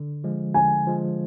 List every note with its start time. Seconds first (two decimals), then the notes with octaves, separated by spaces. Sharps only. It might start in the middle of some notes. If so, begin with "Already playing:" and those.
Already playing: D3
0.24 F3 G#3
0.54 D3 G#5
0.87 F3 G#3